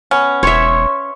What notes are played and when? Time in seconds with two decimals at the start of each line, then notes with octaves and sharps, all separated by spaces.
0.11 B3 C#4
0.43 E1 C#5 E5 C6 C#6